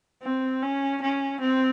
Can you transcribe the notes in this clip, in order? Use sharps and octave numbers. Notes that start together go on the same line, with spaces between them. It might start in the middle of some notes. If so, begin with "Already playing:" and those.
C4
C#4
C#4
C4